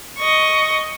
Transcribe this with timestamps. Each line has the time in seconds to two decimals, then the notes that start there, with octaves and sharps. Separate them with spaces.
0.18 D#5 C#6